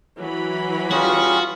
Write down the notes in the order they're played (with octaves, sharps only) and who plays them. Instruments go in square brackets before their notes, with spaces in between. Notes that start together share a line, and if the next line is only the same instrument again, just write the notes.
[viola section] E3 F#3 B5
[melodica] G3 C#4 G#4 [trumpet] F4 [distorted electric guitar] F#4